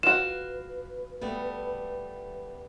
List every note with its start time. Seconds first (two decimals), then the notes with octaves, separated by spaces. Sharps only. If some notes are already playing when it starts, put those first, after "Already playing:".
0.03 F4 F#4 B4 E7
1.22 G3 A3 B3